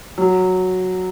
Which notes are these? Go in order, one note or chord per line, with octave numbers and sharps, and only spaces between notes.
F#3